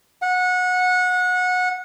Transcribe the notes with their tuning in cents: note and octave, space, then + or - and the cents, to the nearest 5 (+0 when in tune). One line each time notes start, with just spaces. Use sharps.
F#5 -25